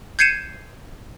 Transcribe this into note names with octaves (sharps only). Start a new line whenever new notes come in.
G6 G#6 C7 C#7 D#7 E7